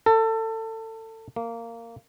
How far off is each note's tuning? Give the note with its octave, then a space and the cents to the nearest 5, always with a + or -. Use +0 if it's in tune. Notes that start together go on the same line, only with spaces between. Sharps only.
A4 +25
A#3 -15